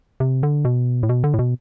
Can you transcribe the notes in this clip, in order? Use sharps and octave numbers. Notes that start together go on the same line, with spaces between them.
C3
D3
B2
A2
B2
D3
A2
B2